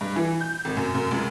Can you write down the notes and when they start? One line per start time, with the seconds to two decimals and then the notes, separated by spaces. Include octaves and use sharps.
0.01 G2
0.16 E3
0.41 G6
0.65 G#1
0.77 F#2
0.95 F#2
1.11 C#2